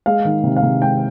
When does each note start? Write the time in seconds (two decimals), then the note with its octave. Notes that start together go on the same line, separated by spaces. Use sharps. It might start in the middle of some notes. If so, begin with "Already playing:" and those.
0.06 G#3 F5
0.25 D#3
0.44 C3
0.57 F5
0.62 C3
0.82 G#3 G5